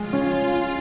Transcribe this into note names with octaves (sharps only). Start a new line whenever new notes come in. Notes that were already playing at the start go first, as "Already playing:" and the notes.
Already playing: G#3 F4
C#4